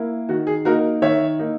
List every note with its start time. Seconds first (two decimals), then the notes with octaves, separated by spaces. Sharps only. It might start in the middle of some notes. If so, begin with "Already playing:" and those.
Already playing: A#3 E4
0.29 D#3 F#4
0.47 G#4
0.65 A#3 D#4 F#4 A#4
1.02 D#3 C#5 E5
1.39 A#3 D#4